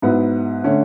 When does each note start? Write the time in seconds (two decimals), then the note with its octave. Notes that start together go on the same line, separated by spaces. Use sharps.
0.02 G#2 F#3 B3 E4
0.64 D3 A3 C#4